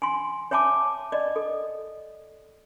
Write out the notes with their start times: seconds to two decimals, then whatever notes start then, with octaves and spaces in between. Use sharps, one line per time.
0.02 G#5 C6
0.51 C#5 E5 G#5 A5 D6
1.12 D5 D#5
1.36 A4